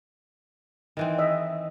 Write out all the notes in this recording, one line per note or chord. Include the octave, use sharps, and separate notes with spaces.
D#3 E3 C4
D#5 E5